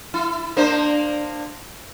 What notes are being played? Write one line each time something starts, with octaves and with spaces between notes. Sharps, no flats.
E4
A#3 D4 C5